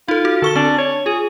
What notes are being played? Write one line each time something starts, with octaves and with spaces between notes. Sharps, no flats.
D#4 F4 A4
F#4
D3 A4 C#6 G7
C4 D4
C#5
F4 G#4